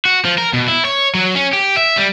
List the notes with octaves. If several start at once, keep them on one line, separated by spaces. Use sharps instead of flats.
F#4
F3
A#4
B2
E4
C#5
F#3
C#4
G4
E5
G3